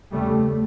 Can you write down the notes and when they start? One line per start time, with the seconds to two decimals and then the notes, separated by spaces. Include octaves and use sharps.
0.12 E2 C#3 G3 A3